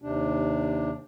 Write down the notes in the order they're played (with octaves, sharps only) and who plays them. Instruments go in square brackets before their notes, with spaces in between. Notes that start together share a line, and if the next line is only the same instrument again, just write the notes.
[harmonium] D#2 C3 D4